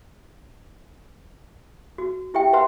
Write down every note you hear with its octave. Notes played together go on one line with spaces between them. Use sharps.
F#4
E4 G4 E5 G5
B4 C5 E5 F#5 A5 C6